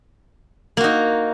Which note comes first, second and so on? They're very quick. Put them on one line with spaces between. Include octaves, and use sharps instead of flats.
A#3 F#4 D#4